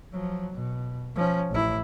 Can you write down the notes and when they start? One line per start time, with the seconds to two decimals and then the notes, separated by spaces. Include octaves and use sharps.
0.12 F3 F#3
0.53 B2
1.16 F3 C#4
1.51 A1 E4